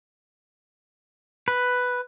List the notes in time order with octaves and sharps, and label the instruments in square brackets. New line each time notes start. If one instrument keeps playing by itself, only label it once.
[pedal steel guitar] B4